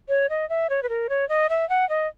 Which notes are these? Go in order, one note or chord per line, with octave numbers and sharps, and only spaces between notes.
C#5
D#5
E5
C#5
B4
A#4
C#5
D#5
E5
F#5
D#5